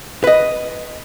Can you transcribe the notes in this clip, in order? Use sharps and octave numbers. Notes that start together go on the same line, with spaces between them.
B4 D#5